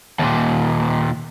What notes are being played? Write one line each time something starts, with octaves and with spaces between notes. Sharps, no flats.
D#2 A#2